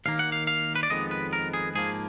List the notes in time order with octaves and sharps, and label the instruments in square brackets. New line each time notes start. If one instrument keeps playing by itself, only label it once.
[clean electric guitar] D#2 D#3 A#3 F5
F#5
F5
F5
B4
D5
F2 D#3 G#3 B3 D#5
B4
A#4
G#4
G#2 F3 A#3 G#4